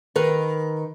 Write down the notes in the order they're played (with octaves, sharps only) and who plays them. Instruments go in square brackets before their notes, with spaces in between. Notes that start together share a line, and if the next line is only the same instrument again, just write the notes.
[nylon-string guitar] D#3 A#4 B4